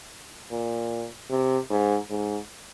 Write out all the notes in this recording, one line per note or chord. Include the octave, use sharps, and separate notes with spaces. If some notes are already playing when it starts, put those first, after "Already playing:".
A#2
C3
G#2
G#2